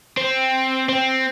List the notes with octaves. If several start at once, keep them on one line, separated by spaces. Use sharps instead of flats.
C4
C4